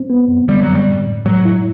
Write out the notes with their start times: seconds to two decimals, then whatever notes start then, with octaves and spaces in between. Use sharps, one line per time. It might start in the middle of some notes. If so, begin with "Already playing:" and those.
Already playing: C4
0.10 B3
0.28 F#2
0.48 D3 G3
0.61 F#3
0.68 F#2
0.75 G3
0.88 A2
1.07 A2
1.26 A2 F#3
1.45 E4